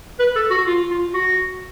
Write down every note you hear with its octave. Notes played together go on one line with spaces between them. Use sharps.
B4
A4
F#4
F4
F4
F#4